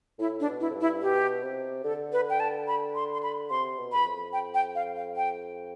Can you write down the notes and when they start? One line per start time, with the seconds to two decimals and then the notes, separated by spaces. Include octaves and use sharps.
0.19 A2 E4
0.40 D4
0.47 B2
0.60 E4
0.70 F2
0.75 G2
0.81 E4
1.02 B2 G4
1.43 C3
1.84 D3 A4
2.13 B4
2.30 G5
2.40 A5
2.67 B5
2.95 C6
3.13 C6
3.23 B5
3.50 C3 C6
3.78 B2
3.92 E2 B5
4.06 F2
4.33 G5
4.54 G5
4.75 F5
4.96 F5
5.16 G5